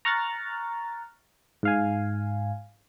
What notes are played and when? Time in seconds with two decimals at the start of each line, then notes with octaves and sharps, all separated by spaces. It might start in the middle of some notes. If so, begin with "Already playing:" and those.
0.05 A#5 C#6 F6 F#6 A6
1.63 G#2 F5 G#5